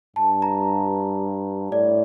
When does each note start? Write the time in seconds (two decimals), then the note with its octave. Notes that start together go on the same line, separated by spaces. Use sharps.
0.16 G2 A5
0.42 A#5
1.71 A2 D5